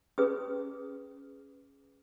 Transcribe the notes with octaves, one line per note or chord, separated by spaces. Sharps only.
C#4 G#4 B4 D#6